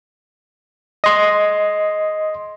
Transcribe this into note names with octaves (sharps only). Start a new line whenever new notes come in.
D#5 C6